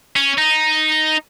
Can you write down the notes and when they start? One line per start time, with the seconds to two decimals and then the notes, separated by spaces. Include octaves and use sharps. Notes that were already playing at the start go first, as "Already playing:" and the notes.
0.16 C#4
0.38 D#4